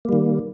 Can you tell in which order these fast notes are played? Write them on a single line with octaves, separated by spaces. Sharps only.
A#3 G3 D#3